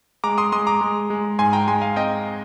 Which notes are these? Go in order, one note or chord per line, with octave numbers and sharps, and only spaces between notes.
G#3 A#5 D6
C6 D#6
G#3 C6 D#6
A#5 D6
G#3
G#3
G#2 G#5 C6
G5 A#5
G#3 G#5 C6
F5 G#5
C4 D#5 G5